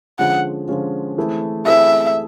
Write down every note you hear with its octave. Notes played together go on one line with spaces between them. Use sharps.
D3 F3 G#3 C#4 F4 F#5
D3 F3 G#3 C#4 F4
E3 A3 C4 E4 G#4
E3 A3 C4 E4 G#4 E5